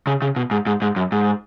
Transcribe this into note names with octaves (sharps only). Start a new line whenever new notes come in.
C#3
C#3
B2
G#2
G#2
G#2
F#2
G#2